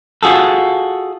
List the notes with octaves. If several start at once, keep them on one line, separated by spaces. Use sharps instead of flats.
F4 F#4 G#4 A4